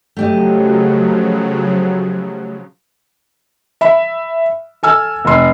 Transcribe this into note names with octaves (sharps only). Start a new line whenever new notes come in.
C#3 F3 F#3 A3 G4 D#5
E5 B5
A4 G#5 E6 F6
F1 C6